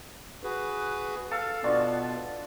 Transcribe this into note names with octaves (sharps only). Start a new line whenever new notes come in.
F#4 G#4 B4
A4 F5
B2 B3 D4 F4 F#4